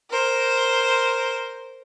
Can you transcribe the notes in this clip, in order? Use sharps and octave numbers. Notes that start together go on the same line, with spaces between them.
A#4 C5